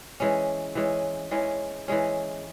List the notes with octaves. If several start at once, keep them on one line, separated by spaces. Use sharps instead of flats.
E3 G#3 C#4
E3 G#3 C#4
E3 G#3 C#4
E3 G#3 C#4